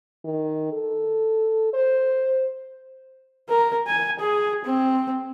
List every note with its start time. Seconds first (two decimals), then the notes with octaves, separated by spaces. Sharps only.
0.24 D#3
0.72 A4
1.73 C5
3.49 A#4
3.87 G#5
4.19 G#4
4.65 C4